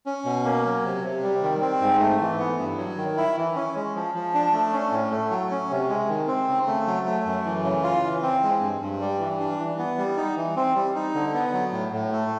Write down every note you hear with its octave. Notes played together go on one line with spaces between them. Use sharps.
C#4
B2
A#3
F#3
C3
C3
G3
D#3
C4
G#2
A3
E3
B3
G2
F#3
D#3
E4
E3
C#4
G#3
F3
F3
D4
A3
C#4
A2
A3
F#3
C#4
C3
G#3
D#3
C4
C#3
A3
F#3
A3
F#2
E3
C#3
F4
E3
C4
G#3
G2
G2
G3
E3
D4
E3
B3
G3
D#4
E3
C4
G3
D#4
D3
B3
F#3
A2
A2
A3